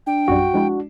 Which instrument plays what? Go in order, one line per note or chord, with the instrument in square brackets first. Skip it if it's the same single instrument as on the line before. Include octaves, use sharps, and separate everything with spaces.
[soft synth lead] D4 [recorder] G5
[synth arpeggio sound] A#1 F#2 G3 [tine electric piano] F#4
[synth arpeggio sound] F3 G#3 E4 [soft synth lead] D4